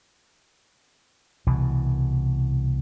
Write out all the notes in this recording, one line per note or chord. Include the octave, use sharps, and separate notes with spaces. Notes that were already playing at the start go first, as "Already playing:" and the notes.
C2 B2 E3